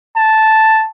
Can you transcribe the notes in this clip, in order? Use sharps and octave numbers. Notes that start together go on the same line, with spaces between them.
A5